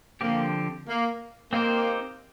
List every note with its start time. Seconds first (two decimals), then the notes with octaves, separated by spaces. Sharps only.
0.21 D3 F3 A#3 C4 G4
0.87 A#3
1.52 A#3 C4 D#4 G4 C5